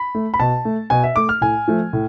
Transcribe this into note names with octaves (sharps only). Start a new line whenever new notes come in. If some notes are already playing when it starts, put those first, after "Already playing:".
Already playing: B5
A3
B5
B2 A5
A3
B2 G#5
E5
A3 D6
F6
A2 G#5
F3 A3
A2